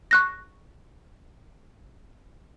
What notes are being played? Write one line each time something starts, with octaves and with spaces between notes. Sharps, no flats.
C#6 F#6 A#6